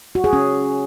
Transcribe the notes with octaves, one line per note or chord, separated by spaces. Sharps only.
F#4
G#4
C#4